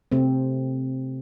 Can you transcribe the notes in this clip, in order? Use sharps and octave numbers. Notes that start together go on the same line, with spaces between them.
C3 A3 C4